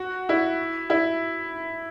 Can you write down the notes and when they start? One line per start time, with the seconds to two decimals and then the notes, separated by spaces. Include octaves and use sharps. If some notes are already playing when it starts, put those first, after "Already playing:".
Already playing: F#4
0.29 E4
0.90 E4